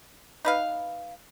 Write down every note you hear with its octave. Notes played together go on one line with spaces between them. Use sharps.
D#4 B4 F5